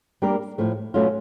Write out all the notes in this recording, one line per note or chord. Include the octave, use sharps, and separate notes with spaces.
G3 A#3 D4 G4 A#4
A2 F3 A3
B2 F#3 A3 C#4 F4